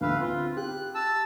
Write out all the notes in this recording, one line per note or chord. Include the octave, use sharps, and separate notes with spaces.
D2 B4 F5 E6
C4 F4
G4 F#6
A5 E6